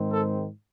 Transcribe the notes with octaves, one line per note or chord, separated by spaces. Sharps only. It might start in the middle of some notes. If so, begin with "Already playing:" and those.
Already playing: G#2 D#3 G#3 C4
A4